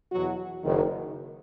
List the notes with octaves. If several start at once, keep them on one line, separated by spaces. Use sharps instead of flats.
E2 B2 F#3 F#4
F#1 F#2 D#3